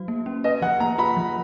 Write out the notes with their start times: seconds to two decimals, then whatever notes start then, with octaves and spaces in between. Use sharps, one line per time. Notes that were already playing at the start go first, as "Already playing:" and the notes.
Already playing: F#3 F#4
0.08 A#3
0.26 C#4
0.44 B4 D#5
0.62 F3 F#5
0.80 A#3 A#5
0.98 F4 B5
1.17 F3